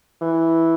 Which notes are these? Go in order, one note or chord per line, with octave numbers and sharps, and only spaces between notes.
E3